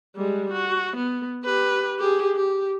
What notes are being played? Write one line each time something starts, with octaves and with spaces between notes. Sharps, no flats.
G3 G#3
F#4
B3
G4 B4
G4 G#4
G4